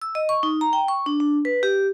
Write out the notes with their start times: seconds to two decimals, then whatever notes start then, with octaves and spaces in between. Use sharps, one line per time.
0.02 E6
0.15 D#5
0.29 C#6
0.43 D#4
0.61 A#5
0.73 G5
0.88 C#6
1.06 D4
1.20 D4
1.45 B4
1.63 G4